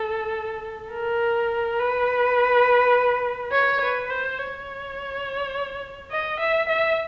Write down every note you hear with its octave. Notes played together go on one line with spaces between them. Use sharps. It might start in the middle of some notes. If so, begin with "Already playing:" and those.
Already playing: A4
A#4
B4
C#5
B4
C5
C#5
D#5
E5
E5